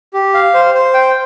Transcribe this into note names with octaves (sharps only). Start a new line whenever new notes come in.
G4
F5
C5
C5
G5